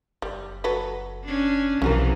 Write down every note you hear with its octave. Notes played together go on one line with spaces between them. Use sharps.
F#1 G3
F#3 A4 B4
C#4 D4
B1 C3 E3 F3 C#4 F#4 A#4